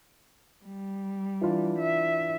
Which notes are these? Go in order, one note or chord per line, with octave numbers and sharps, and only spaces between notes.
G3
E3 D4 F4
E5